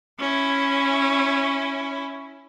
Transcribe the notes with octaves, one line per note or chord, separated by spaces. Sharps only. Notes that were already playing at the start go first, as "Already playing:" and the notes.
C#4 E4